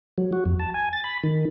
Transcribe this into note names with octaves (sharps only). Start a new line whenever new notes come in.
F#3
F#4
F2
A5
G#5
A6
B5
D#3